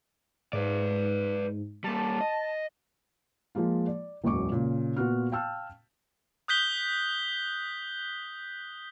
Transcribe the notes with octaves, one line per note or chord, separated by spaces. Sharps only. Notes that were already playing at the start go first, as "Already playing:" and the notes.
G#2 B4 D5
G3 A#3 A5
D#5
F3 G#3 A#3 F4
D5
E1 B1 F#2 C#6 D6
A#2 C#3
A#2 B3 F4 F#4 F#5 F6
F5 G5 A5 E6 F6
D#6 F#6 G6 B6 G7